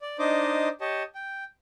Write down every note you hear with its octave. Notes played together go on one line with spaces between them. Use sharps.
D5
D4 D#4 C5 D#5 D6
G4 C#5 D#5 A5
G5